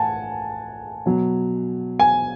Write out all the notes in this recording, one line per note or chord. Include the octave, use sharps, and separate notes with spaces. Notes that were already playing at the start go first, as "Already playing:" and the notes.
Already playing: A2 F#5 G#5 A5
B2 F#3
G#5